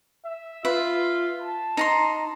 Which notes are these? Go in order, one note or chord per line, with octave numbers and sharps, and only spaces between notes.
E5
F4 B4 E5
A5
D#4 A#5 C6